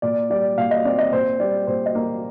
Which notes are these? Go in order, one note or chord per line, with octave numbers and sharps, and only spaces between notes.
A#2 D5
G3 D5
A#2 F5
D#5
C4 D5
D#5
A#2 C5
G3 D5
A#2 C5
D#5
A#3